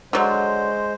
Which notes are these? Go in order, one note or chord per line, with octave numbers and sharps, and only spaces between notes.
D3 F#3 G#3 C5